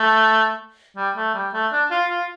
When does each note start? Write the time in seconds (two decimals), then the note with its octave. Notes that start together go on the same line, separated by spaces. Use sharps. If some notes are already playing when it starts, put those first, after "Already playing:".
Already playing: A3
0.97 G3
1.16 A3
1.35 G3
1.53 A3
1.72 D4
1.91 F4
2.10 F4